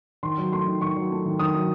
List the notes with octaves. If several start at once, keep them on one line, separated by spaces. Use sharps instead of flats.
D#3 C6
F#3
A3 C6
D#3
D#3 C#6
F#3
A3
D#3
D#3 D#6
F#3